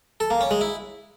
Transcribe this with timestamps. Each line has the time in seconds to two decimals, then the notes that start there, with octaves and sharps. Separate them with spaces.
0.20 A4
0.31 A#3
0.41 C#4
0.51 G#3
0.61 E4